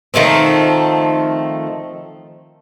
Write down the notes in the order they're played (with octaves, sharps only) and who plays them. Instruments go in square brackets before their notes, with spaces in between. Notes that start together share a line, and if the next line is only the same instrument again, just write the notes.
[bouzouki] D#3 F3 A3 C4